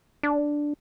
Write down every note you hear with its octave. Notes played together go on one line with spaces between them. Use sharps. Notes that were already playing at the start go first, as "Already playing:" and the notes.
D4